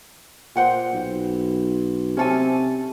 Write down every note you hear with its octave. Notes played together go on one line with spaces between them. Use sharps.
A#2 C5 F#5 G5
B1
C3 C#4 A4 G#5